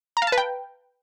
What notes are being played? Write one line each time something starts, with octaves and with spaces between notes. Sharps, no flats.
A#5
F5
A5
B4
G5